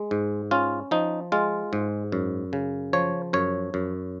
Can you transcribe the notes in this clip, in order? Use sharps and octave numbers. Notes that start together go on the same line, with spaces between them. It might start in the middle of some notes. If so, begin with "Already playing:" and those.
Already playing: G#3
G#2
C#4 F4
F3 D#4
G#3 F4
G#2
F#2
C#3
F3 C#5
F#2 C#5
F#2